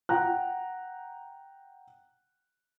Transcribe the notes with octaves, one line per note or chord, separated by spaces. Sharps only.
F#5 G5 A#5 F#6